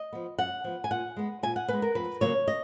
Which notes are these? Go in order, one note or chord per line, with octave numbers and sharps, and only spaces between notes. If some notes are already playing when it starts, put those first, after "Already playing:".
Already playing: D#5
F3 B3
F#2 F#5
F3 B3
G#5
A#2 F#5
G#3 B3
A#2 G#5
F#5
G#3 B3 B4
A#4
F2 B4
C#3 F#3 A#3 C#4 C#5
D#5